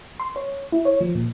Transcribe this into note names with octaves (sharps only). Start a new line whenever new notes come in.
C6
C#5
E4
C#5
F3
A#2